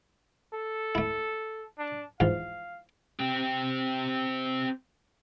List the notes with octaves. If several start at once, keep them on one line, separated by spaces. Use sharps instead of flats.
A4
A3 E4
D4
G#2 E3 F3 F5
C4 G4